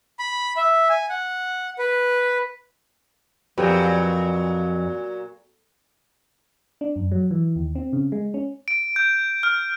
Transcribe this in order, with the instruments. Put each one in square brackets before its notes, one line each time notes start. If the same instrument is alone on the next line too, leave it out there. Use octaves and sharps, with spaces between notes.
[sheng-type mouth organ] B5
E5
G#5
F#5
B4
[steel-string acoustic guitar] F2 [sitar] A#2 F#3 [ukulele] G4 B4
[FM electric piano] D4
F#2
F#3
E3
D#2
C4
C#3
G#3
C#4
[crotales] D7
G6
F6